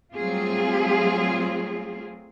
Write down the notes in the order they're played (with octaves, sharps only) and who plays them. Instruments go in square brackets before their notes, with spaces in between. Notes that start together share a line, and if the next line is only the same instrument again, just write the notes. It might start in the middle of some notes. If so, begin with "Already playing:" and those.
[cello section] F#3 G3 A3 C4 F4 G#4